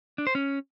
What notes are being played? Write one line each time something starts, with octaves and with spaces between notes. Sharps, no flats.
D4
C5
C#4